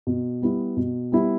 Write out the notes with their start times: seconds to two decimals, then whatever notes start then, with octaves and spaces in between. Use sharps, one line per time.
0.07 B2
0.42 G3 B3 E4
0.77 B2
1.12 G3 B3 E4